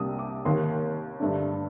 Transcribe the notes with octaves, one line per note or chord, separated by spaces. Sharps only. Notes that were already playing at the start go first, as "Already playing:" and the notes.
Already playing: C2 C3 G3 A#3 D4 D#6
D6
D#2 D#3 A#3 C6
G2 D3 A3 D4